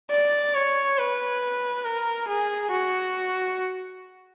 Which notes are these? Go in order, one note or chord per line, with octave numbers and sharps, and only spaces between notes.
D5
C#5
B4
A#4
G#4
F#4